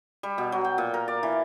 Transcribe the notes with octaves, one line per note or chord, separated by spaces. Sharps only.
G3
B2
F#3
G5
A#2
A#4
D5
E3